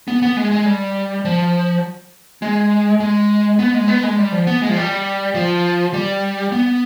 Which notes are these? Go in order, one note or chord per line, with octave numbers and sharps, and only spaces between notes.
B3
B3
G#3
G#3
G3
F3
G#3
G#3
B3
G#3
B3
G#3
G3
F3
B3
G#3
F3
G3
F3
G3
B3